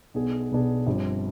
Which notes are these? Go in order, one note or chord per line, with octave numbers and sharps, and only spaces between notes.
B1 B2 B3 D4 G#4
B1 B2 B3 D4 G#4
G1 G2 F3 C4 G4